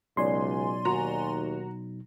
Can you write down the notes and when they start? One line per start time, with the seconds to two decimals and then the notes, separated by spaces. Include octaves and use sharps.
0.17 C#2 B2 F#3 D#4 D5 G#5 C6
0.85 D#2 F#4 A#5